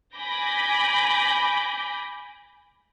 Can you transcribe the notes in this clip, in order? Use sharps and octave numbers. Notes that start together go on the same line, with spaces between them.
G#5 B5 D6 G6 A#6